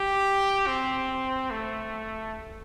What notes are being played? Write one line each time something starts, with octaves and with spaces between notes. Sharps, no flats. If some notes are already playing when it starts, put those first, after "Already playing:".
Already playing: G4
C4
A3